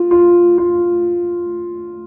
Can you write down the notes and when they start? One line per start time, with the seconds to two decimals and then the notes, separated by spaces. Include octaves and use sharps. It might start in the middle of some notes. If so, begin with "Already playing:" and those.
Already playing: F4
0.11 F4
0.58 F4